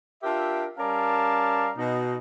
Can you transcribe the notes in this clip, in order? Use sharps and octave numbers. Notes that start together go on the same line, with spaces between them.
D4 F4 G4 A#4 E5
G3 C#4 A#4 D5 F5 A5
B2 D#4